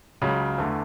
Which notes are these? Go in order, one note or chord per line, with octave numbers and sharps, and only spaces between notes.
C#2 C#3 F#3
E2 D3 A3